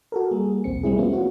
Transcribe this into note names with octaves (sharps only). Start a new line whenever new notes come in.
F#4 A4 A#4
G3 A#3 G#4
B1 E2 C4 C#7
G3 G#3 C4 E4 G#4
F3 A#3 B3 C#4 E4 F4
C4 C#4 F#4